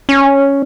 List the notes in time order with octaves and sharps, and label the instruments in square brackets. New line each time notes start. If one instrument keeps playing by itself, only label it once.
[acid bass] C#4